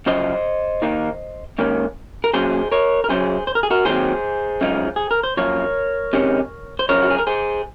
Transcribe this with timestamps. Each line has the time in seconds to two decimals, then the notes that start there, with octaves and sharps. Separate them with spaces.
0.06 F#2 C#3 F3 C5 D#5
0.82 D#2 D#3 A#3 D#4
1.58 G#2 D#3 A#3 C#4
2.24 A#4
2.33 A#2 F#3 C#4 G#4 C5
2.72 A#4 C#5
3.04 A#4
3.09 F#2 C#3 F#3 C#4 G#4 C5
3.47 C5
3.55 A#4
3.63 G#4
3.70 F#4 A#4
3.85 D#2 D#3 F#3 C4 G#4 C5
4.61 F#2 C#3 F3 G#3 D#4
4.96 G#4
5.11 A#4
5.23 C5
5.37 F#2 F3 A#3 A#4 C#5
6.13 C3 D#3 G#3 C#4
6.79 C5
6.89 F#2 C#3 F3 A#4 C#5
7.02 F#4
7.11 G#4
7.18 A#4
7.27 G#4 C5